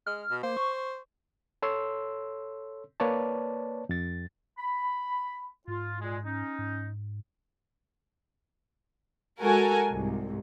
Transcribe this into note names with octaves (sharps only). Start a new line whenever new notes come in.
G#3 F6
B2
A#3 C5
C#6
A4 C#5 C6 E6
A#3 B4 C#5 D5 A5
F2 A6
B5
G#2 F4
A#2 G#3
C#4 D#4
G#2
G#3 F#4 A4 A#4 G#5
C2 G#2